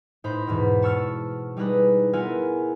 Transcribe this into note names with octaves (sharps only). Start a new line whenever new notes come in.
A2 D#4 C5 B5
E2 G#2 B2
A5 C#6 E6 F6 A6
G3 D#4 E4 G#4 B4
B3 E4 F4 A#4 E5 G#5